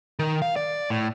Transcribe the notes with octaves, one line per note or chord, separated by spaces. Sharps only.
D#3
F5
D5
A2